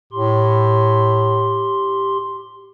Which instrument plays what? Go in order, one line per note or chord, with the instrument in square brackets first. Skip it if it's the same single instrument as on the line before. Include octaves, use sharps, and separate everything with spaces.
[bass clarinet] A2 [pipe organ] G4 C6